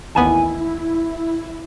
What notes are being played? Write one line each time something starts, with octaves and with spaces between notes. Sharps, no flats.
A1 D#2 B3 E4 G#5